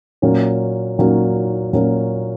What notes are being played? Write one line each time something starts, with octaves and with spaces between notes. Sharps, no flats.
A#2 F#3 A#3 C#4
A#2 F#3 A#3 C#4
A#2 F#3 A#3 C#4